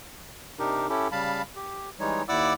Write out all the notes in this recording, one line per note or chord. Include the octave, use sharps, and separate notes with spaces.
C3 D4 D#4 G4 A#4
C#4 E4 G4 A4
C#3 G3 F5 A5 B5
G4
E3 G3 G#3 D#4 C#5
D#2 E4 D5 F#5 D6 E6